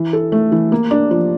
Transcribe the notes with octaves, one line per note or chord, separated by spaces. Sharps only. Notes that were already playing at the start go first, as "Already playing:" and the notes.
Already playing: E3
A4
A3
E3
A#3
D4
F3